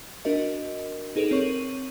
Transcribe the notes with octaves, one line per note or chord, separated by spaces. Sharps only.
D4 F#4 A#4 D#5
D#4 G#4 A4 B4 D7 F7
C4 A#4 C#5 C#6 D#7 F#7